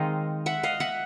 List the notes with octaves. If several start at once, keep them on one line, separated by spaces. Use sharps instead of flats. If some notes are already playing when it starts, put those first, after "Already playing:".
Already playing: D#3 G#3 C4 D#4 D#5 F5
E5 F#5
D#5 F5
E5 F#5